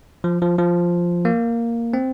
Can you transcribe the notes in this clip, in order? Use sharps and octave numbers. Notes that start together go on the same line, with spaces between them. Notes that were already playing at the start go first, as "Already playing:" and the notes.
F3
F3
F3
A#3
C4